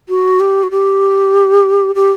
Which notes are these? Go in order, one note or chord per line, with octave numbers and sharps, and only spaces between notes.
F#4
G4
F#4
G4
G4